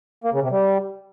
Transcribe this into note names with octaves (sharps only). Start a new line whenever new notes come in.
A#3
C#3
C3
G3